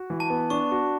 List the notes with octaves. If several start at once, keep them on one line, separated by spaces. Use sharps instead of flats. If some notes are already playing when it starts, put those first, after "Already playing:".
Already playing: F#4
E3
A5
B3
D4 C#6
F#4